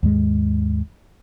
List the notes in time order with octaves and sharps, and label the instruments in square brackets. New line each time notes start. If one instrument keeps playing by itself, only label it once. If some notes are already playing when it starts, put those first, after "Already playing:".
[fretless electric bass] D#2 G#2 G#3